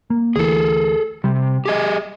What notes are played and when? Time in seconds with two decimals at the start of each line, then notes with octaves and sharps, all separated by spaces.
0.10 A#3
0.36 D2 E3 G#4 A4
1.24 C3 G3
1.65 G4 G#4 D#5